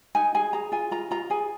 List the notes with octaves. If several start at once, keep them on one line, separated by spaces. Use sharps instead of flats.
D#4 G#5
G#4 G#5
G#4 A#5
F4 G#5
F4 A#5
F4 A#5
G#4 G#5